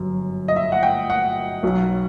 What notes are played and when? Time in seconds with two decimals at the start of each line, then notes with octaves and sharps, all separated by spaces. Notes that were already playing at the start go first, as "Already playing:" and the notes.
Already playing: G1 F#2 F#3
0.48 D#5
0.56 E5
0.72 F#5
0.83 G5
1.10 F#5
1.63 B1 B2 F#3